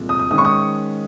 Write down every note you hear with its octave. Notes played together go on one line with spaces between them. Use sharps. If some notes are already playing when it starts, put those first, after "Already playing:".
Already playing: C2 A#2 G#3
D#6
D#6
G#2 D#3 G#3 C#4 D#6
C#6
D#6